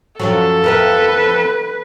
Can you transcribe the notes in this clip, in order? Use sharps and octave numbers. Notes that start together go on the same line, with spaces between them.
F#2 F3 F#3 A4
F2 A#4 B4 E5